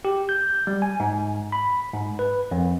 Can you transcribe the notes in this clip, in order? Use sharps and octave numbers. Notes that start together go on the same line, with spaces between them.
G4
G6
G3
G#5
G#2
B5
G#2
B4
F2